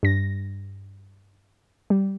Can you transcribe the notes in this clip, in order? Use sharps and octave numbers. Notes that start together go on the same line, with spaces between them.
G2 A#6
G3